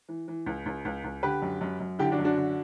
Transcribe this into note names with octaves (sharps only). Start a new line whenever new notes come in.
E3
E3
C#2
C#2
C#2
C#2
D3 G4 B4
F#2
F#2
F#2
D3 E4 G4
D4 F#4
F#2
D4 F#4
D3